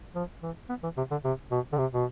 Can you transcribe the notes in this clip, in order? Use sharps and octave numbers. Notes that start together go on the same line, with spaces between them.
F3
E3
B3
E3
C3
D3
C3
B2
D3
C3
B2